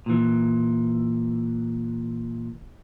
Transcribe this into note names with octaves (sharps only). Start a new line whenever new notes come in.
A#2 E3